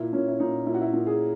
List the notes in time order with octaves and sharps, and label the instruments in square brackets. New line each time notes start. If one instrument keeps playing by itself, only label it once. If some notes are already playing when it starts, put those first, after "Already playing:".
Already playing: [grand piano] A#2 E4
A#2 C#4
E4
A#2 D#4
A#2 E4
F#4
E4
A#2
G#4